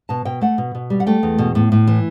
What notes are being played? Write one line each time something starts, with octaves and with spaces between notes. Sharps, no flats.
B2 A5
B2 G5
A3 F#5
B2
B2
G3
F#5
A3 G5
E2
B2
A2
A2
E3